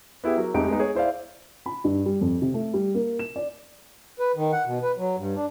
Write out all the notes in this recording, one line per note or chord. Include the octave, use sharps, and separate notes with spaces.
B3 E4 G4 G#4
F#3 A#4
F2 G#3 A3 D#4 G4 D7
G#3 B3 D#4
G#4 C#5
E4 C5 D5 F5
B5
G2
G3
F2
C3
A3
G3
A#3
E7
D5
B4
D#3
F#5
B2
B4
F#3
G2
D4